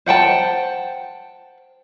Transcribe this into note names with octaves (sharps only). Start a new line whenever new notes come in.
C5 F#5 G5 A5